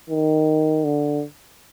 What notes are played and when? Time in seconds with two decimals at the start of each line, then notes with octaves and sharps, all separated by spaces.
0.10 D#3
0.84 D3